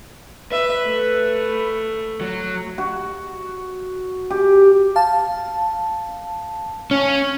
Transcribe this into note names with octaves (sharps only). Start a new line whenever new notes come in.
B4 E5
A3
F#3
F#4
G4
F5 A5
C#4